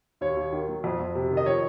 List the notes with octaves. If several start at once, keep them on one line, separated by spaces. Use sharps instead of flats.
D#2 C#5
D#2
D#3
F#3
F2
F2
C3
D#3
D#5
F3 C#5